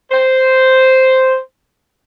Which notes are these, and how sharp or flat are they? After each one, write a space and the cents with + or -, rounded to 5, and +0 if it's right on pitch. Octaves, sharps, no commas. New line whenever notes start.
C5 -5